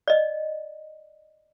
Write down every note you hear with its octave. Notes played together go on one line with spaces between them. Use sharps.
D5 D#5